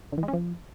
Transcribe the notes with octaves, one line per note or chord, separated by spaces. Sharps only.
D3
E3
G#3
C#4
F3